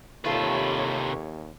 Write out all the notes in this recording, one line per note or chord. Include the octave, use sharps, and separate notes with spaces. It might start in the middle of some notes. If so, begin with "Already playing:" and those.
D#2 C3 A3 F4 G4 A4 B4 C#5